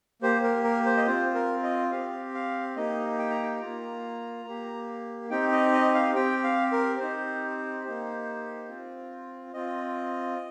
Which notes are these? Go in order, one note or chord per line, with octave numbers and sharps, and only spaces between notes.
A#3 G4 C5
A#4
A#4
C5
D#5
C4 F4 C5
A#4
D#5
C4 G4 F5
F5
A#3 D#4 G4 D#5
G5
A#5
G5
A#3 F4 A#5
A#3 G4
C4 D#4 G4 G5
D#5
D#5
F5
C4 G4 G5
F5
A#4
C4 D#4 G4 C5
A#3 D#4 G4
C4 F4
C4 F4 D#5